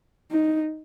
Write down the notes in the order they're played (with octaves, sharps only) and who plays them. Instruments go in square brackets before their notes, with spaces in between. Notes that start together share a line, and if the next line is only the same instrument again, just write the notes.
[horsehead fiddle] D#4